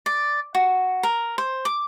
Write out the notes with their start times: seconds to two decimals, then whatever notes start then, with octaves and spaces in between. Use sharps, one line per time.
0.06 D5
0.55 F#4
1.03 A#4
1.38 C5
1.65 D6